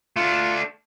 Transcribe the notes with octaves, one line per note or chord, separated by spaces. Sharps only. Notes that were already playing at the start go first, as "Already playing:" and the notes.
A3 D4 F4